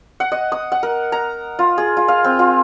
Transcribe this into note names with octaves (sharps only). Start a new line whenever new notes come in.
F#5
D#5
D#6
F#5
A#4
A#5
F4
G#4
F4
F5
C4
F4